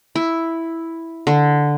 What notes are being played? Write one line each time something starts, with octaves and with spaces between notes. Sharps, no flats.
E4
D3